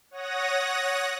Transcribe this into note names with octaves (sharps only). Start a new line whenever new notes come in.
C#5 F#5 D#6 A#6